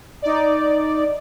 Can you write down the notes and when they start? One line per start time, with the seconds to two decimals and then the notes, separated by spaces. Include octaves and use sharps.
0.22 D#4 D5